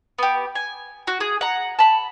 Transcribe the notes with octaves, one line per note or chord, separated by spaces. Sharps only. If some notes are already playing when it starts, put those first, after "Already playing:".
B3 G4
G#5
F#4
G#4
F#5 A#5
A5 B5